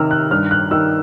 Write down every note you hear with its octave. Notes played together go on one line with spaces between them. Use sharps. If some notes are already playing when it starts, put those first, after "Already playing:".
Already playing: C3 D#3 E6 F6
F#6
G2 F6
F#6
D#3 E6